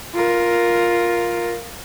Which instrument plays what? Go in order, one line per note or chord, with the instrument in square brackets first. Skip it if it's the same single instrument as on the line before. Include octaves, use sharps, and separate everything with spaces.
[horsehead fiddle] F4 A#4